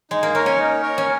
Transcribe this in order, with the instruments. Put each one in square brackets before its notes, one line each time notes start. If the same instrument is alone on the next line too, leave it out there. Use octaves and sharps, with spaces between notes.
[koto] G#3 [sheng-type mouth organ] D#4
[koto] A#3
[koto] A#3 [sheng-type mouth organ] A#4 C#5
[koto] C#4
[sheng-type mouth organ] D#4
A#4 C#5
[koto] C#4